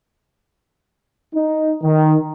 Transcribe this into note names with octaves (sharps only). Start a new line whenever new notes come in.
D#4
D#3